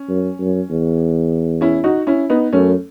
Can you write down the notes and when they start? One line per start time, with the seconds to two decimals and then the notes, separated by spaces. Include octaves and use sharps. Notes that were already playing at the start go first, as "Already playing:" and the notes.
Already playing: C#4
0.09 F#2
0.39 F#2
0.70 E2
1.61 C#4 E4
1.84 D#4 F#4
2.07 C#4 E4
2.30 B3 D#4
2.53 F#2 A3 C#4